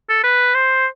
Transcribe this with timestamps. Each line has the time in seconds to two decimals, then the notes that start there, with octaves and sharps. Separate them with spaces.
0.09 A4
0.24 B4
0.54 C5